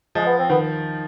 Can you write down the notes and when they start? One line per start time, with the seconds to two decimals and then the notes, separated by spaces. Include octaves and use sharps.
0.15 F3 G#3
0.26 B3
0.39 C4
0.50 D#3 B3